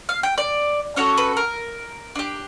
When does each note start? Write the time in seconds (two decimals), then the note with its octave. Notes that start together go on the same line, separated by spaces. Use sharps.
0.09 F5
0.23 G5
0.38 D5
0.96 C#4 F#4 A4 C#5
1.18 B4
1.37 A#4
2.15 D4 G4